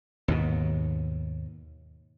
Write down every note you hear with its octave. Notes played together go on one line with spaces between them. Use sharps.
D#2 G#2 B2